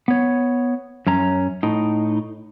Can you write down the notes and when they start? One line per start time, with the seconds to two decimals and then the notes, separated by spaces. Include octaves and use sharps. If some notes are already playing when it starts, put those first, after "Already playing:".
0.08 B3 C#5
1.07 F#2 C#4 A#5
1.63 A2 D#4